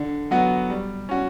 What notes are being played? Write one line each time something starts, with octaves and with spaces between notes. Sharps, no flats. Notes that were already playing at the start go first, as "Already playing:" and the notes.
Already playing: D3
F#3 B3 F#4
G3
C#4 F#4